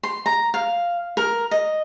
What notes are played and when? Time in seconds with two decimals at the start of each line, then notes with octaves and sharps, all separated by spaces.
0.03 C6
0.26 A#5
0.54 F5
1.17 A#4
1.51 D#5